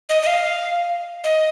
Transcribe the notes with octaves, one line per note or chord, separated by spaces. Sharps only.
D#5
D#5
F5
D#5